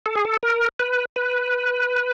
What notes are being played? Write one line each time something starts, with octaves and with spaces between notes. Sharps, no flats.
A4
G#4
A4
A#4
B4
B4